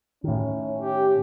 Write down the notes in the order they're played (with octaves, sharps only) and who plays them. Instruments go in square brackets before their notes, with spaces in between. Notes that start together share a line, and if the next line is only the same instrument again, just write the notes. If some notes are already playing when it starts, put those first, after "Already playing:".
[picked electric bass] A2 D#3 [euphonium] C#4
[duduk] G4